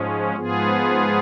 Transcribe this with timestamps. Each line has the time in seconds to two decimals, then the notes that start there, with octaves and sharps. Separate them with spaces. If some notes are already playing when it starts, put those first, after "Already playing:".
Already playing: G#2 F3 G#3 C#4
0.36 G#2 F3 B3 F4 G#4